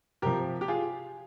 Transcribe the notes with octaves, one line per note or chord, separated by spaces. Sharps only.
C3 F3 G4 A#4
G4
F4 G#4